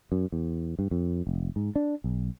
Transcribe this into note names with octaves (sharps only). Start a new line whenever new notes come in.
F#2
E2
G2
F2
F1
G#2
D4
B1